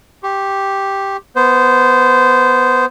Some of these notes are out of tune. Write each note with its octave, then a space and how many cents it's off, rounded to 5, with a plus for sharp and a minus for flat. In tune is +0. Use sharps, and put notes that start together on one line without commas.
G4 +0 C#6 -40
B3 +0 C5 -15